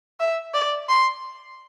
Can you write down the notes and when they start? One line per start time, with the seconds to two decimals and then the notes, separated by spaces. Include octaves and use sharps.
0.20 E5
0.54 D5
0.89 C6